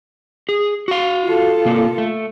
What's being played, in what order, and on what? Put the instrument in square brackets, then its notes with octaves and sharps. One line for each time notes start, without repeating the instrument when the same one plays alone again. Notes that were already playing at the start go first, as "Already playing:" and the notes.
[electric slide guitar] G#4
F#4 F5
[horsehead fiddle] F4 A4
[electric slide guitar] C3 A#3
A3